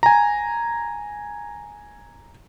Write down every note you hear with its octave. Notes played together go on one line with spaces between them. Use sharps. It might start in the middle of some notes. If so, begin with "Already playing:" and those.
G#5 A#5